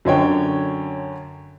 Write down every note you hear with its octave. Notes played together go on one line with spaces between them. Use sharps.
F#2 D3 C#5 G5